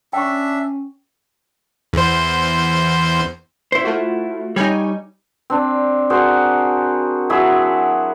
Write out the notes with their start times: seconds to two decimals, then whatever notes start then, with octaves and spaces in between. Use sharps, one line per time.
0.13 C#4 D4 E5 G5 C#6
1.93 E2 C5
3.72 E4 C5
3.84 A3 F4 F#4
4.56 G3 D#4 C#5 G5 G#5
5.50 C4 D4
6.10 F#4 G#4 A#4 C5
7.30 F#3 E4 G#4 E5